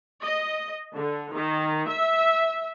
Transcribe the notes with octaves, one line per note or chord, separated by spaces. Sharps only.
D#5
D3
D#3
E5